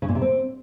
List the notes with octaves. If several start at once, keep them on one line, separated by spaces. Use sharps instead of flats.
C#3
A#2
C3
C4